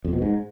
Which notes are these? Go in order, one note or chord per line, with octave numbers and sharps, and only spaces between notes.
F2
B2
G#2